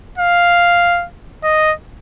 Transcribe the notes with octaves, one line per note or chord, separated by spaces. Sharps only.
F5
D#5